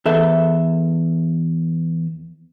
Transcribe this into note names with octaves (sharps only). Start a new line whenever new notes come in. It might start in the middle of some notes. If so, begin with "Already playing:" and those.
E2 A4 E5